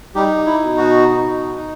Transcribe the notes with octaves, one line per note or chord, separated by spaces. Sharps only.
G3 D#4 G4
E4
B2
F#4
D#4
D#4